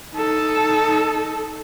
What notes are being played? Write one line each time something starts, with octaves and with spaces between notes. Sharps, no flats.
D#4 A4